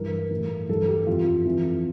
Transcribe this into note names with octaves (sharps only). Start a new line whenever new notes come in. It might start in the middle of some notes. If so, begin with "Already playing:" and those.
Already playing: G2 E3 A#4
A2 E3
G2 E3 A4
G4
F2 E3 F4
F2 E3